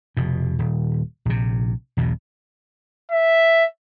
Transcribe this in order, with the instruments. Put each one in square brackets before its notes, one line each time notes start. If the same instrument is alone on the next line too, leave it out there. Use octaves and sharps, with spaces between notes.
[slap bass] F1 B2
D#1
A#1 C3
B1 E2 G#2 B2
[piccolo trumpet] E5